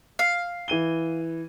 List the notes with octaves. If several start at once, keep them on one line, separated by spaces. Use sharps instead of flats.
F5
E3 D#7 G7